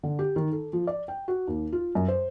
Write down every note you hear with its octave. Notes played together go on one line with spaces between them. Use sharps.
D3
G4
D#3
A4
F3
D5
G5
F#4
D#2
F4
F#2
C5